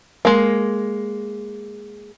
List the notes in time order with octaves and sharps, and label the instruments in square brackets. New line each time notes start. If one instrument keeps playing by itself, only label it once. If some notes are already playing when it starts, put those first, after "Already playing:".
[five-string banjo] G#3 A#3